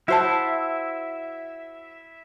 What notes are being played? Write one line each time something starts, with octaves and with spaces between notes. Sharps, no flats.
E4 F#4 C5 E5 A5